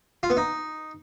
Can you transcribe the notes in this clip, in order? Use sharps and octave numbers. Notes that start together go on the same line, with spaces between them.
F4
B3
D#4